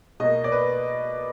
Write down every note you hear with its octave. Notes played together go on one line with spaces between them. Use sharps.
B2 A#3 D#5
D5
B4